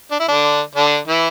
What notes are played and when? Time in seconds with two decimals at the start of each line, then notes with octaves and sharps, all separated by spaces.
0.11 D4
0.20 E4
0.28 D3 D4
0.75 D3 D4
1.07 E3 E4